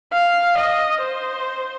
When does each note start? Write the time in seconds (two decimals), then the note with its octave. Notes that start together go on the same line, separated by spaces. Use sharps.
0.12 F5
0.58 D#5
1.01 C5